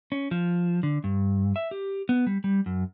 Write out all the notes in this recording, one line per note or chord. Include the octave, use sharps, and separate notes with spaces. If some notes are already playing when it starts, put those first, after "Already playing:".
C#4
F3
D3
G2
E5
G4
B3
G3
G3
F#2